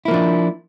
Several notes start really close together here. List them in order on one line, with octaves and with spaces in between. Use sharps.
E4 A#3 F3 D4